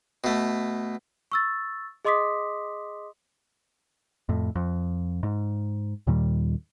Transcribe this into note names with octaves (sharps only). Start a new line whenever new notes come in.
B2 A3
C#6 E6 A6
G#4 D#5 C6 D6 D#6 B6
F2 A2
F2
G#2
D#2 A#2 D#3 G3